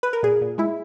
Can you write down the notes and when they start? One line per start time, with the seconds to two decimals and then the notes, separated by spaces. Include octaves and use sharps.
0.03 B4
0.13 A#4
0.23 A#2 G#4
0.41 A#2
0.58 G#3 E4